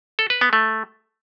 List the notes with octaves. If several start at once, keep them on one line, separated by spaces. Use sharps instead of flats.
A4
B4
B3
A3